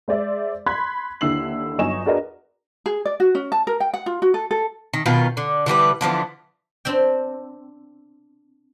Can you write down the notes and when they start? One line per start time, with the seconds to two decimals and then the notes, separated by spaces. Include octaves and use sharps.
0.08 G#3 C5 D5 E5
0.66 B5 C6 F#6 G#6 B6
1.21 D#2 D3 E4 E6 C7 F#7
1.78 G1 F#3 D#4 G#5 C#6 E7
2.06 D4 F#4 G#4 A#4 B4 D#5
2.86 G#4
3.05 D5
3.20 F#4
3.35 C#4
3.52 A5
3.67 A#4
3.80 G5
3.94 F#5
4.06 F4
4.22 F#4
4.34 A4
4.51 A4
4.93 D#3
5.06 B2 D#3 F4 B4
5.37 D3
5.66 D3 E3 G3 B4
6.01 D3 E3 F3 B3
6.85 C4 D4 G5